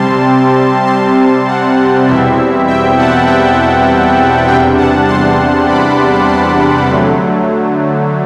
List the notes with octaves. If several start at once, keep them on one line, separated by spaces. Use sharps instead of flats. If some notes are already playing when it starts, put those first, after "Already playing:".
Already playing: C3 G3 C4 A5 C6
A5 C6
F#5 A5
E2 B2 G3 C4 E4 E5
E5 G5
F#5 A5
E5 G5
E2 C3 G3 D4 E5 G5
F#5 A5
A5 C6
B5 D6
A5 C6
D3 F#3 A3